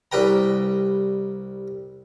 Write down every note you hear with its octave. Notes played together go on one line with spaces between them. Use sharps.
C2 G3 B4 G5 A#5